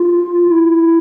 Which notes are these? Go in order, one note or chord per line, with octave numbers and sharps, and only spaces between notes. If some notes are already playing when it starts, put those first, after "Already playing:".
Already playing: F4
E4